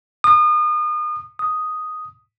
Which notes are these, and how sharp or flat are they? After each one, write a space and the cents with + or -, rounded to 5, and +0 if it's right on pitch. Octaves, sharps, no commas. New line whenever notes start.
D#6 -35
D#6 +0